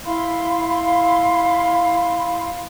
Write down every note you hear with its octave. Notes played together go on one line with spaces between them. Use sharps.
E4 F5 B5 C6